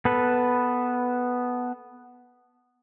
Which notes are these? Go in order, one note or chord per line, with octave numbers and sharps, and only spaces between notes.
B3 A4 B4